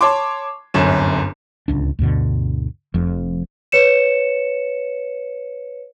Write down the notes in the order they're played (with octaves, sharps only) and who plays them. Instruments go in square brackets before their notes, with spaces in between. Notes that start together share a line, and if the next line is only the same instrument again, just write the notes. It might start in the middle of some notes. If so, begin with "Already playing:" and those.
[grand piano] C#5 A5 C6 D6
D1 G1 F#2 C#4 E7
[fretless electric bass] D1 G1 C#2 D4
D2 G2 B2 D3
F1 F2
[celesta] B4 C#5 C#7 E7